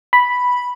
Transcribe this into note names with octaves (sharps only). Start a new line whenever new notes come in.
B5